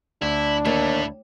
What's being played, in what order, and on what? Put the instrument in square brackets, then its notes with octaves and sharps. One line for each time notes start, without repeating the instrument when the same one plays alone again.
[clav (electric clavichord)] D2 [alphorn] D4 [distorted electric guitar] E4
[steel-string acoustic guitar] D#2 [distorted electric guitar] A3 E4